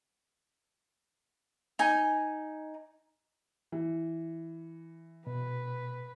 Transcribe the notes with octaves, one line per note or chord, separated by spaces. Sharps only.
D#4 G#5
E3
B2 B4